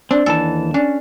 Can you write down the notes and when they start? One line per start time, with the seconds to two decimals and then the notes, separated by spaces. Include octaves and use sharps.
0.11 C4 D4
0.26 D#2 E3 A4 A5
0.74 C#4 D4